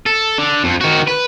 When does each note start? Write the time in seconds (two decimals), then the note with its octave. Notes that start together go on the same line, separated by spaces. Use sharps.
0.06 A4
0.39 D3
0.64 F2
0.81 D#3 F#4
1.07 B4